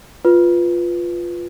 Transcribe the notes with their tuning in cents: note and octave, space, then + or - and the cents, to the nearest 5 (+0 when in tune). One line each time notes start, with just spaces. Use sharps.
F4 +0 B4 +0